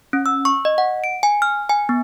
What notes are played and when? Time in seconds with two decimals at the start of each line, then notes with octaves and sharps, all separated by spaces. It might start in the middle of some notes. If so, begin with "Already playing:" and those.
0.13 C#4
0.26 E6
0.45 C#6
0.65 D#5
0.78 F#5
1.04 D7
1.23 G#5
1.42 F6
1.70 G#5
1.89 B3